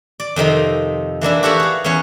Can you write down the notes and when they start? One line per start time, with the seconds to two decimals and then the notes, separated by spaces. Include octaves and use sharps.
0.20 D5
0.36 F2 C3 D#3 D#4
1.21 E3 A#3 D4 E4
1.43 F#4 G4 A4 C#5 E5 F#5
1.59 G#4 F5
1.84 E2 B3 C#4 C#5 F#5 G#5